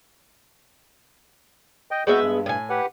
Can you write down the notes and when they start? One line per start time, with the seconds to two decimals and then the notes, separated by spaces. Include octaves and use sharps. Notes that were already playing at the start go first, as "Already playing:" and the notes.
1.91 D#5 G5
2.07 G#3 B3 F#4 E5 G6
2.22 G2
2.46 A2 G#5
2.70 G4 B4 F#5